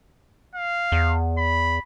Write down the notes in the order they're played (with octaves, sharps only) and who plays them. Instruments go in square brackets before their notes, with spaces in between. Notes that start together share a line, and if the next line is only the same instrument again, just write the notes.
[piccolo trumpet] F5
[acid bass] E2
[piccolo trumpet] B5